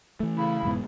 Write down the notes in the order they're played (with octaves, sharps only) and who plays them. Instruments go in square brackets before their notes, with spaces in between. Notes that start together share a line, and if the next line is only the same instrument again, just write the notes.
[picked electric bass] E3 A3
[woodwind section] C#3 E4
[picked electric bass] E1 G#2 B3